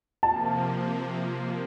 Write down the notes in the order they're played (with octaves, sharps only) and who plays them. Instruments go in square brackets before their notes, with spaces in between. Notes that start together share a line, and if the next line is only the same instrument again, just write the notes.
[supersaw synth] C3 F3 A#3 [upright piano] A5